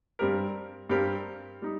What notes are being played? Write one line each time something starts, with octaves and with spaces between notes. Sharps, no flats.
G2 G3 C4 G4 A#4
G2 G3 C4 G4 A#4
G3 D#4